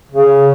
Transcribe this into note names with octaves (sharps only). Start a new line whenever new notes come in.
C#3